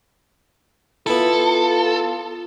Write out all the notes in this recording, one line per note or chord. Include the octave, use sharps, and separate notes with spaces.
B3 E4 F4 A4